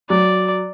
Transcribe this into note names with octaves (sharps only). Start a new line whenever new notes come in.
F#3 D5